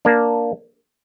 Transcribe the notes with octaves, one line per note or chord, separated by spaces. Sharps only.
A#3 D4